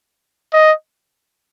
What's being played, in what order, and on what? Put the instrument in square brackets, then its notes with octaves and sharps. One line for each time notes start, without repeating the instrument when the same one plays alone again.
[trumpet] D#5